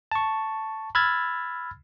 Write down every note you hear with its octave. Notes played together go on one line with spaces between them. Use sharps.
A5 C#6
B5 E6 F6 G#6 A6